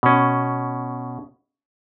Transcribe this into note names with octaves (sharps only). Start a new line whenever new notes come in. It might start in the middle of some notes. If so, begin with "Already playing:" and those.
B2 C#4